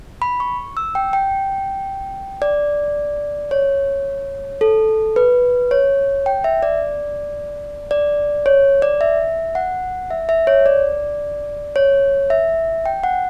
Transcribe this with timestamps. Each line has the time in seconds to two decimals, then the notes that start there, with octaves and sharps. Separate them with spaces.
0.22 B5
0.40 C#6
0.77 E6
0.95 G5
1.13 G5
2.42 D5
3.51 C#5
4.61 A4
5.16 B4
5.71 C#5
6.26 G5
6.44 E5
6.63 D5
7.91 D5
8.46 C#5
8.82 D5
9.01 E5
9.55 F#5
10.11 E5
10.29 E5
10.47 C#5
10.66 D5
11.76 C#5
12.30 E5
12.86 G5
13.04 F#5